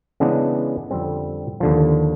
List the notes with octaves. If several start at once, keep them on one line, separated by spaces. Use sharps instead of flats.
C#3 E3 G#3 B3 D4
F2 D3 G3 C4
D#2 D3 F3